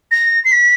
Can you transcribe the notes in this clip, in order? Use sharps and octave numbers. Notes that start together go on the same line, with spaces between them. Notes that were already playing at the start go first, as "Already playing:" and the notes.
A#6
C7
B6